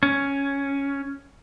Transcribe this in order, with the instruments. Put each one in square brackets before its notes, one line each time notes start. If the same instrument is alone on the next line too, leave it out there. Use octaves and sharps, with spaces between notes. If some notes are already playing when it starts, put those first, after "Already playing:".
[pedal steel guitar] C#4